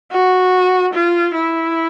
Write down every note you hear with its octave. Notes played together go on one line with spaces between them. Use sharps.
F#4
F4
E4